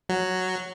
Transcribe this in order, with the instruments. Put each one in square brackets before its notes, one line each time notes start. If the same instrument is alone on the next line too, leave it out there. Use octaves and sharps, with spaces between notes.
[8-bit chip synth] F#3